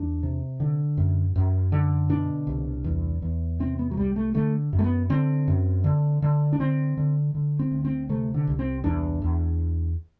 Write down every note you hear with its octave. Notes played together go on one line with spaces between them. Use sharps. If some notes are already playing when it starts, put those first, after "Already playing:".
Already playing: E2 D4
C3
D3
F#2
F#2
D3
B2 D4
C2
E2
E2
C3 C4
B3
F#3
C2 G3
A3
D3 A3
F#2
A3
B3
D3 C4
F#2
D3
D3
D4
D3 C4
D3
D3
C4
D2
C4
C3 A3
D3
C2
C4
E2 D4
E2